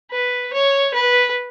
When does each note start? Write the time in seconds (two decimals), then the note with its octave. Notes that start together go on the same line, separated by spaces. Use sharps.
0.11 B4
0.53 C#5
0.94 B4